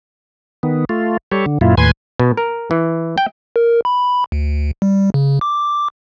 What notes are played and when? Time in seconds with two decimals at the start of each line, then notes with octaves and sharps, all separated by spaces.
0.63 D#3 B3
0.89 A3 F4
1.32 G3 G4 A4 C#5
1.46 D3
1.61 F#2 A#2 E4 F4
1.77 D#2 A2 B4 G#5 C6 G#6
2.19 B2
2.37 A#4
2.71 E3
3.18 G5
3.56 A#4
3.85 B5
4.32 D2
4.82 G3
5.14 C#3
5.41 D6